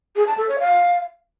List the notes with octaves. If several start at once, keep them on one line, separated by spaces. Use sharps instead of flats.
G#4
A5
A4
C#5
F5